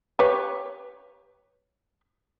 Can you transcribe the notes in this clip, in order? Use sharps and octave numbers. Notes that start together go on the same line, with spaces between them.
G4 B4 C#5